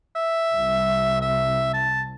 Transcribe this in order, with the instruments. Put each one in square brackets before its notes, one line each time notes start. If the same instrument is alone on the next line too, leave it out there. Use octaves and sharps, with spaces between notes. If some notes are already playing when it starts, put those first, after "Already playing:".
[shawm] E5
[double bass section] C2
[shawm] E5
A5